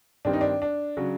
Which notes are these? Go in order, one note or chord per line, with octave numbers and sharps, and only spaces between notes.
G2 D#3 G3 C4 D4
D#4
D4
D4
C#3 F#3